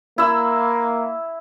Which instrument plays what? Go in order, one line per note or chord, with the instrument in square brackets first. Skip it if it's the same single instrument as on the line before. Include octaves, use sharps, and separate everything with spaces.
[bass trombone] A#3 [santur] E4 E6